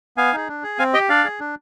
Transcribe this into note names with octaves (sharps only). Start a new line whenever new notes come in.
B3 F5 G#5
D#4 G#4
D4
G#4
C4 F5 G#5
G4 D#5 G5
D4 D5 F5
G#4
D4